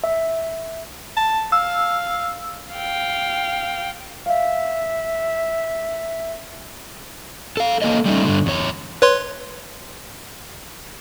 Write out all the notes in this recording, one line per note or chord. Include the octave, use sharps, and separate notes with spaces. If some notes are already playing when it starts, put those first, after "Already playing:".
E5
A5
F5 E6
F5 G5
E5 F5
A4 F5
A#3 A4 C#5 D#5
G3 A3 C#4 D#4
G2 D3
E2 C#5
B4 C#5 C6